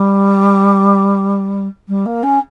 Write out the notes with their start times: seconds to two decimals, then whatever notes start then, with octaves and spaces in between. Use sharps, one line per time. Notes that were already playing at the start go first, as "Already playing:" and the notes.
Already playing: G3
1.88 G3
2.06 A#3
2.23 C#4